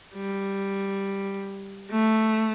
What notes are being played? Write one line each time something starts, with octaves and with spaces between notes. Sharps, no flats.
G3
A3